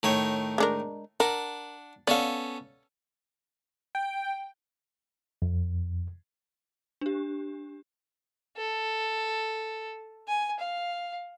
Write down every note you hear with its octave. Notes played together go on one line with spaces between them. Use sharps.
A2 D#3 C#5
G#3 D4 A#4
D4 A#4 F#5
B3 C#4 A4 D5 F5
G5
F2
D4 G4
A4
G#5
F5